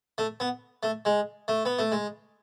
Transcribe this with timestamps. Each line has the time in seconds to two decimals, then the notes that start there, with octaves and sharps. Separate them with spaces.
0.18 A3
0.40 B3
0.83 A3
1.05 G#3
1.48 A3
1.65 B3
1.79 A3
1.92 G#3